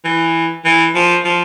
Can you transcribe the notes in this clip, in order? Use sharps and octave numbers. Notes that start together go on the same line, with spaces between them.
E3
E3
F3
F3